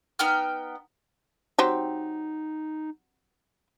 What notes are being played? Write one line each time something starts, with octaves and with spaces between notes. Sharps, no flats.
B3 D#4 G5 F6
F#3 C4 D#4 G4